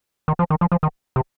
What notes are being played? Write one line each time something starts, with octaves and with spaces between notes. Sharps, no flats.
D#3
F3
D#3
F3
F3
D#3
C3